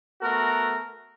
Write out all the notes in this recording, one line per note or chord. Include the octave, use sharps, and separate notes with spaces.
A3 B3 F#4 A#4